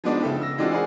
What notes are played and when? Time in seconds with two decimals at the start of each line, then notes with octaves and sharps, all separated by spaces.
0.04 F3 G#3 B3 D4 D#4 F#4
0.22 C#3 A4 E5 G5
0.41 E6 A#6
0.58 E3 G#3 C4 D4 F4 F#4
0.71 G#4 A#4 C5 D5 F#5 G#5